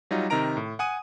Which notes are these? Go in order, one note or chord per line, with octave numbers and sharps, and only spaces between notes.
F#3 G3 D#4 F4
C3 D#3 D#4 A#4 A#5 D7
A2
F#5 G#5 D#6 D#7